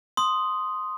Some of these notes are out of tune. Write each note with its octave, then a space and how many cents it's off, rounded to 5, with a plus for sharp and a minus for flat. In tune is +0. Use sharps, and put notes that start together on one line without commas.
C6 +0 D#6 +0